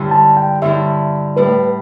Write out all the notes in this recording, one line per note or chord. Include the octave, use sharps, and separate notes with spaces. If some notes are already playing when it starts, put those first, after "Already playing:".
Already playing: G2 D3 G3 E4
A5
G5
G2 D3 G3 E4 E5
A2 G3 E4 B4